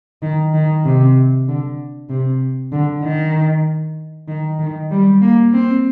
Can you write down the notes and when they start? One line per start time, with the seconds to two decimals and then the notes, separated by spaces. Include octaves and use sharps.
0.22 D#3
0.54 D#3
0.85 C3
1.48 D3
2.10 C3
2.72 D3
3.03 D#3
4.28 D#3
4.59 D#3
4.91 G3
5.22 A#3
5.53 C4